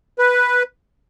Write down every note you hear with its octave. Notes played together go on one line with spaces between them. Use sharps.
B4